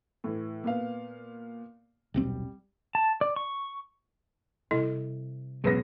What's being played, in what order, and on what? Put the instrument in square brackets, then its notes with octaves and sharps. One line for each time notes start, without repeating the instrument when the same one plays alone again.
[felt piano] A2 E3
A#2 B3 F5
[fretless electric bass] D#1 B1 C4 [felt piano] G3
[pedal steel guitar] A5
D5
C#6
[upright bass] C3 G3 [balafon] E4 A4 D#5
[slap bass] B1 E2 C#3 [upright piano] G#2 B4 A#6